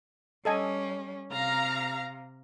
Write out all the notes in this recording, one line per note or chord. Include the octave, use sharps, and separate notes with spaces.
G3 C#4 A4 D#5 G#5
C3 F5 A#5